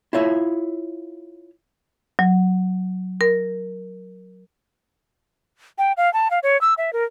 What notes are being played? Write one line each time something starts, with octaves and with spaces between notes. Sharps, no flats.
E4 F4 C#5 E5
F#3
A#4
G5
F5
A5
F5
C#5
E6
E5
A#4